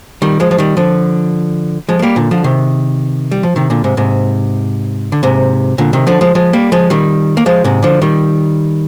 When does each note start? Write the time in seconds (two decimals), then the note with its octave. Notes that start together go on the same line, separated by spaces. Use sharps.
0.22 D#3 G3
0.40 F3 G#3
0.51 F3
0.58 D#3 G3
0.77 D3 F3
1.89 F3 G#3
1.99 G#3
2.02 G3 A#3
2.16 A#2 D3
2.31 D3 F3
2.44 C3 D#3
3.31 G3
3.43 F3
3.56 C3 D#3
3.70 A#2 D3
3.84 G#2 C3
3.97 G#2 C3
5.12 D3
5.23 G#2 C3
5.78 A#2 D3
5.93 C3 D#3
6.07 D3 F3
6.21 F3 G#3
6.35 F3 G#3
6.53 G3 A#3
6.72 F3 G#3
6.90 D#3 G3
7.37 A#3
7.46 F3 G#3
7.64 G#2 C3
7.83 D3 F3
8.02 D#3 G3